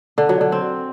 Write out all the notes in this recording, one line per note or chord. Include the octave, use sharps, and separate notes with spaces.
D3
F#3
D3
C4